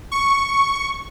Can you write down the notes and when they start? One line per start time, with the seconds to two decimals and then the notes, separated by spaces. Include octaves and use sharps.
0.12 C#6